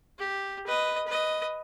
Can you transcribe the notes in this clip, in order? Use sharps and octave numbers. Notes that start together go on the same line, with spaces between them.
G4
B4 D#5
B4 D#5